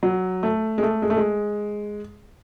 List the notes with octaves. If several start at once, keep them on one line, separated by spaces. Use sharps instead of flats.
F#3
A3
G#3
A3
G#3
A3
G#3